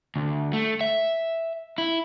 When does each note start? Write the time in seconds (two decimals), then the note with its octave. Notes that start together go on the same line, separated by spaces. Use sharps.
0.16 D2
0.53 A3
0.81 E5
1.78 E4